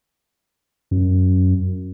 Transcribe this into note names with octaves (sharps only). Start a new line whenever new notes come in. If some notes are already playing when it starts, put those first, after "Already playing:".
F#2